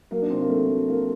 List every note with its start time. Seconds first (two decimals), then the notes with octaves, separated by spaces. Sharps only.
0.11 F#3 A#3
0.22 D4
0.30 C3 C4
0.41 A#3
0.50 F#3 A3
0.69 F#3
0.88 C2 A#3